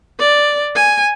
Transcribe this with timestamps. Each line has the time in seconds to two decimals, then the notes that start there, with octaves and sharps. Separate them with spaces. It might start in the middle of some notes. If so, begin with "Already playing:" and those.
0.20 D5
0.75 G#5